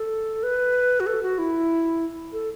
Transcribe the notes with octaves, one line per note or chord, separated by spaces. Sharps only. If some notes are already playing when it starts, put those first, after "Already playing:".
Already playing: A4
B4
F#4
A4
F#4
E4
A4